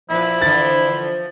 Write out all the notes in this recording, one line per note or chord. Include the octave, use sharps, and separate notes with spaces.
A#2 F3 E4 B4
D3 E3 B4 A6